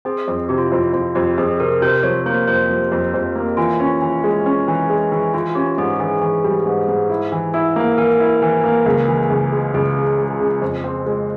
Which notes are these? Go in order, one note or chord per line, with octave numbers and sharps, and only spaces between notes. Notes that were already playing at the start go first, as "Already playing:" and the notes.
C4 G#4
F2
C3 G4
F4
E4
F2 F4
F2 F4
F2 G4
F2 G#4
C3 A#4
C3 C5
F3 C#5
A#3 C5
F2 C5
F3
F2
F2
A#3
E3 F4
C#4
E3
G#3
C#4
E3
G#3
E3
E3 F4
F4
C#4 G4
G#2 G#4
E3 G#4
E3
G3
G#2
G#2
E4
E3
E4
A#3
E3 A#4
E4
E3
A#3
C#2
E3
C#2
G#3
C#2 G#4
C#3
G#3
C#3
F2
C4
G#3